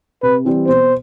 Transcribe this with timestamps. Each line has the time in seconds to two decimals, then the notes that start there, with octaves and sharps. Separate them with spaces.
0.23 C3 B4
0.45 E3 G3 C4 G4
0.67 B2 C5